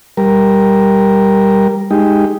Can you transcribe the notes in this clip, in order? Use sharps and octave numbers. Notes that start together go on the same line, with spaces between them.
G3 A#4
G#3 D#4 G4